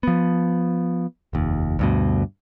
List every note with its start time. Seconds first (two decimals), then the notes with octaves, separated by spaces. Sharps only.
0.03 F3 B3
1.33 F1 D#2
1.79 D2 G2 B2